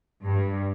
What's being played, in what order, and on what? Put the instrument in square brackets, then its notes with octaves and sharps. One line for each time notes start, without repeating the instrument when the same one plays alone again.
[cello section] G2